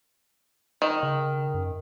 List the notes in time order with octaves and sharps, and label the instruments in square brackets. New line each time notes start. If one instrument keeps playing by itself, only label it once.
[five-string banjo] D#3
[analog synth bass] C#3
F#2